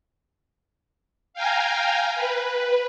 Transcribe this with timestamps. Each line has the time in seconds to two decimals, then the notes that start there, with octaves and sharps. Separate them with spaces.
1.34 F5 G5 G#5 A#5
2.15 B4